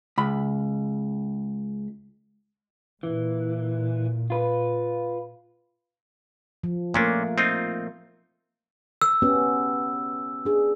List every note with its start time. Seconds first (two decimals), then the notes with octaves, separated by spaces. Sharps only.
0.18 C#2 B5
3.03 A#2 E3
4.30 F4 B4
6.64 F3
6.94 A#2 A3 A#3 C#4 D4 A#4
7.38 C4 D#4 F4
9.02 E6
9.22 B3 C#4 G4
10.45 D4 G#4